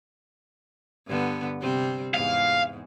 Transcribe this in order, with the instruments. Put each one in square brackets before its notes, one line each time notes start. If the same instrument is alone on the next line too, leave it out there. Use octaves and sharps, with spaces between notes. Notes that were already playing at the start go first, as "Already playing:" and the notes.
[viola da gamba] G2 D3 B3
C3 G3 C4
[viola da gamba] E2 G#2 [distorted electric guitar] F5